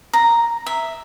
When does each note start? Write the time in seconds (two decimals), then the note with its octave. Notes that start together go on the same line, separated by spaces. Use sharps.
0.13 A#5
0.66 E5